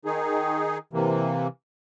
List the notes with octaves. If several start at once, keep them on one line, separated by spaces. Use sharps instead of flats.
D#3 D#4 G#4
C3 E3 A#3